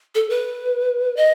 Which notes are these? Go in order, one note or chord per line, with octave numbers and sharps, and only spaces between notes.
A4
B4
D#5